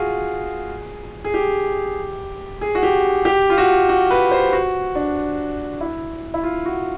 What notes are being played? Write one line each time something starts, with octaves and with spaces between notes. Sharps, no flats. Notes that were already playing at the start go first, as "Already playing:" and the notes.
Already playing: F4 F#4 G#4
G#4
G4
G#4
F#4
G4
G4
F4
F#4
F#4
B4
C5
F#4
D4
E4
E4
F4
F#4